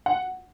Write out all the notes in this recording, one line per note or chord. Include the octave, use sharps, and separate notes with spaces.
F#5